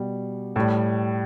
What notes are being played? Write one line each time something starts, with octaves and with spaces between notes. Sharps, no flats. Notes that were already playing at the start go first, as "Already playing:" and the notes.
Already playing: B2 G3
A2 G3